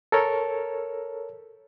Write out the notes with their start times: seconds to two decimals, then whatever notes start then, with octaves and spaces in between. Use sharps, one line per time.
0.12 A4 A#4 C#5